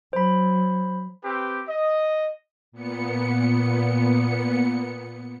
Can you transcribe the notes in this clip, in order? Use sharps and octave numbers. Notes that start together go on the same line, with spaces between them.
F#3 C5 B5
C4 G4 B4
D#5
A#2 B3 C#7